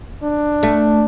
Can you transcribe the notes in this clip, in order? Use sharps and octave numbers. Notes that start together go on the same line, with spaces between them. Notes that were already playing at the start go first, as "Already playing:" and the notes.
D4
A3